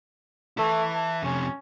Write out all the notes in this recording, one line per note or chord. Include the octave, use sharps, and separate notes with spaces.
E3 A3 E4
A5
F2 C3 C#4